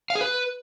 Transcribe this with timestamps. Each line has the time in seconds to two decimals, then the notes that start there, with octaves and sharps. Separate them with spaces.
0.10 F5
0.15 G#4
0.21 B4